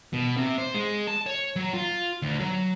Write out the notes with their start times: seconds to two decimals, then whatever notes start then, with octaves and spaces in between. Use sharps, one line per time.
0.13 B2
0.37 C3
0.58 C5
0.74 G#3
1.07 A5
1.26 C#5
1.56 F#3
1.73 F4
2.22 D2
2.40 F#3